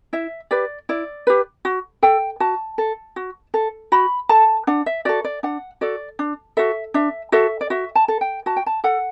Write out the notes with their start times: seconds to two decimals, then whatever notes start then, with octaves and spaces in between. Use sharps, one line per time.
0.13 E4 E5
0.51 G4 B4 D5
0.89 E4 D5
1.27 G4 B4
1.65 F#4
2.02 A4 G5
2.40 F#4 A5
2.78 A4
3.16 F#4
3.54 A4
3.92 F#4 B5
4.29 A4 A5
4.67 D4 F#5
4.86 E5
5.05 F#4 A4 D5
5.24 D5
5.43 D4 F#5
5.81 F#4 A4 D5
6.19 D4
6.57 F#4 A4 E5
6.94 D4 E5
7.32 F#4 A4 E5
7.61 D5
7.70 F#4 E5
7.95 A5
8.08 A4
8.21 G5
8.46 F#4 A5
8.56 G5
8.66 A5
8.84 A4 F#5